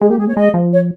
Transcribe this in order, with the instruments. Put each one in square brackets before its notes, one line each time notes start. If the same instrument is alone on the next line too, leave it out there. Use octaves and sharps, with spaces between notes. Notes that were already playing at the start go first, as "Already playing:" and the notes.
[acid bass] G#3 [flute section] G#4
[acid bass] A#3 [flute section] G4
[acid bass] G#3 [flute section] G#4
[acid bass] A#3 [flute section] C#5
[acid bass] G#3 [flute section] D#5
[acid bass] F3
[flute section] C#5